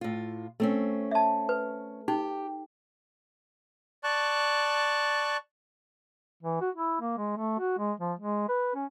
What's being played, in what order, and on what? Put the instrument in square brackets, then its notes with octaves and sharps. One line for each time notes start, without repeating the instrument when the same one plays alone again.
[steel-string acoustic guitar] A2 F4
A3 C4 C#4
[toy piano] E5 A5
B4
[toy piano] D#4 [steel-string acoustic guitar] G4
[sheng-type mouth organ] D5 A5 C#6 F#6
[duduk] E3
F#4
E4
A#3
G#3
A3
F#4
G#3
F3
G#3
B4
C#4